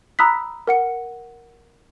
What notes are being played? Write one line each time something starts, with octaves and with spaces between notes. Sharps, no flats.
A#5 B5 D#6 E6 F#6 B6
A#4 F#5 C#7